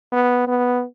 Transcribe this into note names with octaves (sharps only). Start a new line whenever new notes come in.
B3
B3